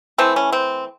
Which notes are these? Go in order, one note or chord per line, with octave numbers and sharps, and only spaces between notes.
E3 A3 C4
C#4
C4